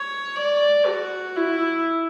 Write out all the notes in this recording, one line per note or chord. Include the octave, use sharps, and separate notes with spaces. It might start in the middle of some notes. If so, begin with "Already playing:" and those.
Already playing: C#5
D5
F#4
E4